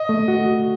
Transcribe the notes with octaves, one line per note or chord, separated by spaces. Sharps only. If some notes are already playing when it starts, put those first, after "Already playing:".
Already playing: D#5
A3
F#4